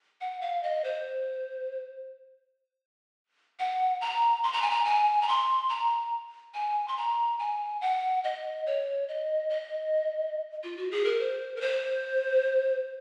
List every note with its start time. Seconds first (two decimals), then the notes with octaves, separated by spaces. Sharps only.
0.21 F#5
0.41 F5
0.63 D#5
0.84 C5
3.59 F#5
4.01 A#5
4.43 C6
4.53 A#5
4.62 G#5
4.71 A#5
4.85 G#5
5.22 A#5
5.28 C6
5.69 A#5
6.54 G#5
6.88 C6
6.97 A#5
7.39 G#5
7.81 F#5
8.24 D#5
8.66 C#5
9.08 D#5
9.50 D#5
10.64 F4
10.77 F#4
10.91 G#4
11.05 A#4
11.20 C5
11.56 A#4
11.61 C5